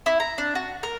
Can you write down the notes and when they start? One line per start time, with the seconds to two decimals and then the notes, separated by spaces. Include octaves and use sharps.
0.06 E4
0.20 A#5
0.38 D4
0.55 F#4
0.83 A#4